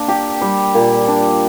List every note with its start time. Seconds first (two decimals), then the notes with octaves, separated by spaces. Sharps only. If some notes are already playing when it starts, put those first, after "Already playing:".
Already playing: A#3 D4
0.08 G4
0.41 G3
0.75 A#2
1.08 D4